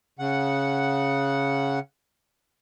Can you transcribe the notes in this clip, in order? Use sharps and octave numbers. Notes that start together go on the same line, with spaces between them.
C#3 F#5